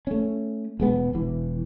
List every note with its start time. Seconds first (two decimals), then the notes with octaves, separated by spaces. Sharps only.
0.07 A3 C#4
0.80 E1 G#3 B3
1.13 E1 E3